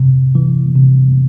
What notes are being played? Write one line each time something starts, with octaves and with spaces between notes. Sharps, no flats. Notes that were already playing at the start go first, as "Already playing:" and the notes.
Already playing: C3
E3
C3